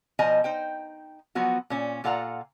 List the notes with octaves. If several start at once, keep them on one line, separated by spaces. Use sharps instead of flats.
B2 F3 C5 D#5 G#5 A#5
D#4 C5 G5
F3 F#3 B3 F#4
A#2 C#4
A#2 F4 A4 F5 F#5 A#5